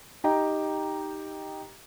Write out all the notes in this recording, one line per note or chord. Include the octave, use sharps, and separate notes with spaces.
D#4 G4 D#5 G5 A#5